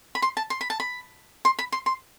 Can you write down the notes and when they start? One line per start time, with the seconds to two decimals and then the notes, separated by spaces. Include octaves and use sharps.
0.15 B5
0.22 C6
0.37 A5
0.50 C6
0.61 B5
0.70 A5
0.80 B5
1.45 C6
1.59 B5
1.72 C6
1.86 C6